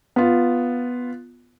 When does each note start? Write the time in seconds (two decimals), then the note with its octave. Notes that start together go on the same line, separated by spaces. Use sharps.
0.16 B3 F4